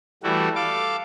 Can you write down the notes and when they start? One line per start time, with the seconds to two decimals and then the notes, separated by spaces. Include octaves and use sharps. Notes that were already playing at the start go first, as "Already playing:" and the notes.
0.23 E3 G3 A3 E4 F#4
0.55 A4 F5 D6